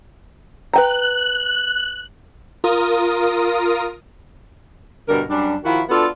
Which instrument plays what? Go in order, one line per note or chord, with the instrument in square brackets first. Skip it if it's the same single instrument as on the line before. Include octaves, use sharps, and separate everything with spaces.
[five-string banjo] B4 G5 A#5 [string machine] F#6
[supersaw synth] F4 A#4 D#6
[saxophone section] G2 B2 D3 A#4
F#2 G3 D4
D#3 F3 E4 F#4
B3 D4 F4 F#4 A4